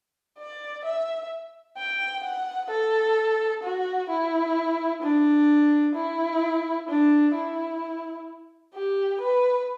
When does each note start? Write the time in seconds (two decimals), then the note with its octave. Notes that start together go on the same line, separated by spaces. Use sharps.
0.38 D5
0.85 E5
1.77 G5
2.24 F#5
2.70 A4
3.63 F#4
4.09 E4
5.02 D4
5.95 E4
6.89 D4
7.35 E4
8.74 G4
9.21 B4